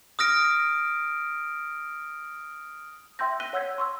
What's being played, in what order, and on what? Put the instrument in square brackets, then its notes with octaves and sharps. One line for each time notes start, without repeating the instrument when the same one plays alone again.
[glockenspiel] D#6 F6 A#6 D7
[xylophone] E5 G5 C6 E6 G6 A#6
F#6 A#6 B6 D#7 G7
C#5 F#5 E6 G6 G#6 B6
C6 C#6 E6